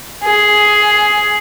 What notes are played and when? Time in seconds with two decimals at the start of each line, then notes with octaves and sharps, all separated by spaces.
0.24 G#4